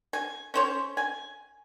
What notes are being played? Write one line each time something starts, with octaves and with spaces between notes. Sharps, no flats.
G#5
C#4 C5 C#5
G#5